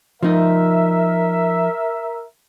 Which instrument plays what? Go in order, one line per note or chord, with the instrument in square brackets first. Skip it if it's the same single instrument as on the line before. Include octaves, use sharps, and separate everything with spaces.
[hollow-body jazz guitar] F3 D#4 [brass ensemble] A#4 E5